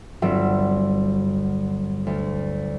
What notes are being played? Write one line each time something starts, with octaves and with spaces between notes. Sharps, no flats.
G1 F#3 G3 C4 E5 D#7
D2